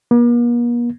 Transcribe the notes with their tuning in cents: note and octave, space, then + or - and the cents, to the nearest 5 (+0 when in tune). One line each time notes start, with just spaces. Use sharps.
A#3 +45